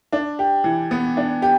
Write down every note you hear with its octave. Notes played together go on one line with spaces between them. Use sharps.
D4
G4
E3
B3
D4
G4